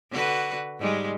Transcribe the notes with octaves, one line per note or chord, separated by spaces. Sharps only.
D3 F#4 B4
G#2 G3 G#3